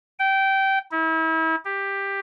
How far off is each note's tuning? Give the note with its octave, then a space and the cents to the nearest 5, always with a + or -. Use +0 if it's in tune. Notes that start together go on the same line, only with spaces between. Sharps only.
G5 -20
E4 -35
G4 +10